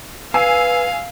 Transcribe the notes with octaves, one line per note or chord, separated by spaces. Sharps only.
B4 F5 G#5 E6 C7